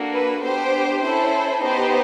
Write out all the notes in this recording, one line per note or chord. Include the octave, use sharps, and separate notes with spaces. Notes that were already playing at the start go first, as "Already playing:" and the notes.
Already playing: A#3 D4 F#4 A4
B4
B3 D4 G4 C5
C#4 E4 A4 C5
B3 D#4 G4 C5